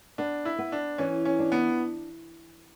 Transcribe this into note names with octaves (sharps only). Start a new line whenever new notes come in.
B3 D4
E4
B3
D4
E3 C#4
C#4
D4
B3